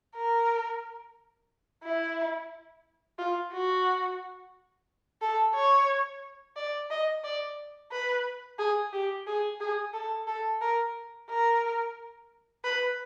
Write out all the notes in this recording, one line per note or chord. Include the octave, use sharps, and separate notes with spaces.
A#4
E4
F4
F#4
A4
C#5
D5
D#5
D5
B4
G#4
G4
G#4
G#4
A4
A4
A#4
A#4
B4